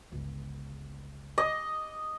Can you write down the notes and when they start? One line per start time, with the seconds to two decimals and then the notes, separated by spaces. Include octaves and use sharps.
0.12 G1 C#2
1.38 D#5